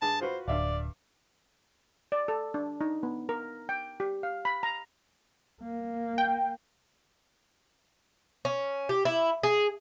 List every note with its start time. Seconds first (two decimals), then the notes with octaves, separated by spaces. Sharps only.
0.02 G2 G#4 A5
0.21 F4 F#4 B4 C5
0.48 D1 G2 D5 E5 F5
2.12 D5
2.28 A4
2.54 D4
2.81 D#4
3.03 B3
3.29 A#4
3.69 G5
4.00 G4
4.23 F5
4.45 B5
4.63 A#5
5.62 A#3
6.18 G5
8.45 C#4
8.89 G4
9.05 E4
9.43 G#4